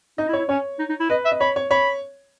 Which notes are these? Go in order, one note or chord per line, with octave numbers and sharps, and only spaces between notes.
D#4 D#5
E4
C#5
E4
C#4 C#5
D#4
D#4
E4
B4 D#5
E5
D#5
C#5 B5
C#5
C#5 B5